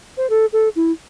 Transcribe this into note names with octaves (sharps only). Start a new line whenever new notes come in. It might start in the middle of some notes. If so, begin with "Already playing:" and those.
C5
A4
A4
E4